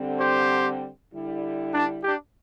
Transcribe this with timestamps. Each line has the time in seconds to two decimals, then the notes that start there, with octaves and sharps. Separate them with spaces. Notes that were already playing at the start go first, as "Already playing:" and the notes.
Already playing: D3 G3 C4
0.20 G4 C5
1.12 D3 G3 E4
1.74 D4
2.04 D4 G4